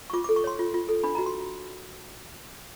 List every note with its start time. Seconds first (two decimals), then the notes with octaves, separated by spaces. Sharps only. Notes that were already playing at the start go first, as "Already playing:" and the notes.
0.10 C#6
0.13 F4 D6
0.24 D6
0.29 A4
0.36 C#6
0.44 C#5 C6
0.59 F4
0.74 F4
0.89 A4
1.04 D4 B5
1.15 A#5
1.18 F#4
1.26 C6